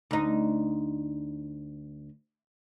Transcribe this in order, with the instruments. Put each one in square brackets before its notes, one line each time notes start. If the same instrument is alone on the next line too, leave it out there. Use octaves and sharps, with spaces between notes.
[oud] D2 D#4